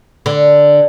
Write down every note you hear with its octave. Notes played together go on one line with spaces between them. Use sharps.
D3